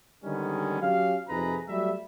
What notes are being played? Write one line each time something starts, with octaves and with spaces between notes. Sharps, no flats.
D3 D#3 G3 G#3 B3 C#4
F#3 C#4 G4 F5
F2 C3 D#4 G#4 B4 A#5
F#3 G3 A3 E5